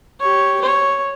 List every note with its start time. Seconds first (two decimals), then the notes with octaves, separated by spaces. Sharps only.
0.20 G4 C#5
0.61 C#5